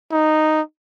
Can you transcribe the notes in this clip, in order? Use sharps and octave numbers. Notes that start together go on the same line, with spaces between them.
D#4